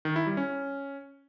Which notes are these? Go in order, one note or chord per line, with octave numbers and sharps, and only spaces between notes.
D#3
E4
G3
C#4